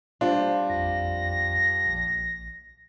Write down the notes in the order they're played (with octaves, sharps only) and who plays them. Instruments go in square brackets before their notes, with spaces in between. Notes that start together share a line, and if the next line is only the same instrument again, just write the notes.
[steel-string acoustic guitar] G3 C4 F4 [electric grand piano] D4
[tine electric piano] A1 F2 [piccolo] A#6
[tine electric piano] A#1